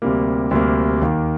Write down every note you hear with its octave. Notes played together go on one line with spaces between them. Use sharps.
D2 C3 G3 A#3
D2 C3 G3 A#3
D#2 D#3 A#3